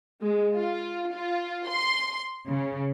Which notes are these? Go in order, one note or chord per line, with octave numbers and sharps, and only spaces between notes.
G#3
F4
F4
C6
C#3